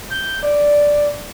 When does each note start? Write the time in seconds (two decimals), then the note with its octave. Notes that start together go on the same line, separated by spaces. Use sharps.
0.10 G6
0.43 D5